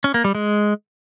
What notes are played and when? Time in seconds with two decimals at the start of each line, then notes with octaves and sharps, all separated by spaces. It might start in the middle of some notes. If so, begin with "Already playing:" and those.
0.04 C#4
0.14 A#3
0.24 G3
0.35 G#3